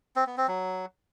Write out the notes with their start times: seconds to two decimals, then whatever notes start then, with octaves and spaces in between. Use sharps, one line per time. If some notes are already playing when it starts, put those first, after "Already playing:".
0.16 C4
0.27 B3
0.37 C4
0.48 F#3